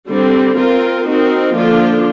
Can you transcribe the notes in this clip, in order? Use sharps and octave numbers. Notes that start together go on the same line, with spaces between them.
D3 G3 C4
C4 F4 A#4
C4 D#4 F#4 A#4
D3 F3 A#3 D4 F4